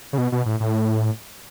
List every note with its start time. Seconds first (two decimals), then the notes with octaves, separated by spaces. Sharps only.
0.13 C#3
0.18 B2
0.32 B2
0.46 A2
0.60 A2